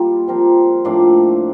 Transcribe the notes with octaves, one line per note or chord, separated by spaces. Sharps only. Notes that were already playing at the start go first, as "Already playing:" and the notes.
Already playing: G3 A#3 F4
F3 C4 G4 A#4
A2 F3 A#3 D4